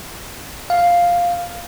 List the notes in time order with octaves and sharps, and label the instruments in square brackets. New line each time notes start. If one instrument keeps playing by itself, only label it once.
[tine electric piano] F5